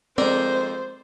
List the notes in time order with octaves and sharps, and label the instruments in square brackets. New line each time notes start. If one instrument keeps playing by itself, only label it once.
[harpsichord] F2 G#3 A#4 [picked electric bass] C4 [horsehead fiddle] C5 [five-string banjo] D5